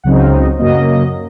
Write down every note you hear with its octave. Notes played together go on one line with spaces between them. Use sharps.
C#2 C#3 F#3 C4 D#4 F#5
F5
D#5
F#2 C#3 F#3 A#3 D#5